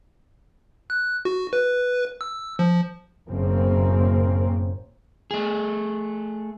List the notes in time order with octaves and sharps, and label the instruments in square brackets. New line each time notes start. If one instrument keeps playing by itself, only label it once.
[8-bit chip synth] F#6
F#4
B4
E6
F3
[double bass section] F#1 F#2 A2 C#3 A#3 C4
[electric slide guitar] A3 G#4